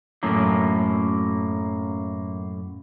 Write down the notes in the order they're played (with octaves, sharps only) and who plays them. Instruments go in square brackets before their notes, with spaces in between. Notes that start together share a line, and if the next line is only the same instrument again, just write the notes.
[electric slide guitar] F#2 A2 A#3